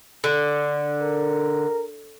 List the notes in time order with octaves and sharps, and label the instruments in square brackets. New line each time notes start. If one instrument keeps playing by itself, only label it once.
[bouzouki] D3
[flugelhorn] A#4